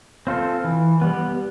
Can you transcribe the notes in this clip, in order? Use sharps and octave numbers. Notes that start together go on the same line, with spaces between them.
C4 F4 A4
E3
G3 B3